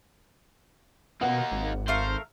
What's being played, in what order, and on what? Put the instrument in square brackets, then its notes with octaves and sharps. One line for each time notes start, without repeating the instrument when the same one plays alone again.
[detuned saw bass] B2 [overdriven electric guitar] A#3 D#4 [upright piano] F#5
[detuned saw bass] G#1
[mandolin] A3 A#4 F5 [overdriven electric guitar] C5